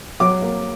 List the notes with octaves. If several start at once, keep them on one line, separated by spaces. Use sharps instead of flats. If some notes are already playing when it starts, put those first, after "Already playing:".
F#3 D6
A#3